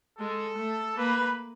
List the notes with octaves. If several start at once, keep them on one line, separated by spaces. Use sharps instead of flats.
G#3 A4
A3
A#3 B4